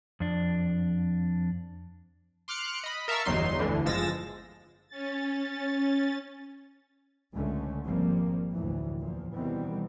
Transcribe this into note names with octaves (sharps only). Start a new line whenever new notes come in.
F2 D4
C6 D6 F6 F#6 C#7
D#5 B5
A#4 E5 F5 A5 C#6 E6
G1 E2 F#3 D#4 C6
G1 D2 D3 E3
G1 F3 G#3 E6 A6 A#6
C#4 A6
C#2 D3 G#3 A3 C#4
G#1 F2 F3 G3 A#3 C4
F1 D2 A2 E3
E2 A#2 F3
B2 D#3 E3 G3 B3 C4